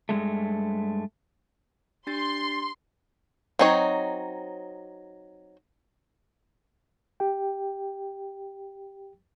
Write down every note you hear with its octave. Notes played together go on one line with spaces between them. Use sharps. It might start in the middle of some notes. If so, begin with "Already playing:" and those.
G2 C#3 G#3 A3
D4 G4 C6 A6
F#3 C4 D#4 C#5
G4 G5